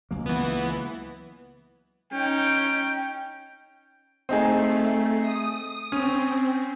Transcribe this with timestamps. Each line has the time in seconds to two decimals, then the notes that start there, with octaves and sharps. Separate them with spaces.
0.11 C#2 F#3 A#3
0.26 E3 B3
2.13 C#4 D#4 G5
4.29 A3 C4 D#4 G#4
5.21 D#6
5.92 C4 C#4